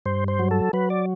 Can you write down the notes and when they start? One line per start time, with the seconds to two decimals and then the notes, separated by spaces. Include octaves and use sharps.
0.06 G2 C5
0.28 C5
0.39 F#3
0.51 A4
0.73 F#3 B4
0.90 D5